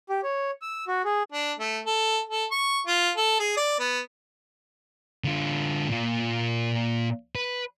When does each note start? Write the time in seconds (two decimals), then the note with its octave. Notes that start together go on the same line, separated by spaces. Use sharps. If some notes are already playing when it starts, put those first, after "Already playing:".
0.09 G4
0.23 C#5
0.62 E6
0.88 F#4
1.05 G#4
1.32 D4
1.59 A3
1.86 A4
2.29 A4
2.51 C#6
2.87 F4
3.17 A4
3.40 G#4
3.57 D5
3.79 B3
5.24 D3 F4
5.88 A#2 F4
7.35 B4